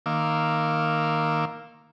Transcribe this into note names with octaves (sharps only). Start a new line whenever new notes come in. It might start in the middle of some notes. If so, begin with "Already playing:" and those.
D#3 A#3 F5 D6 E6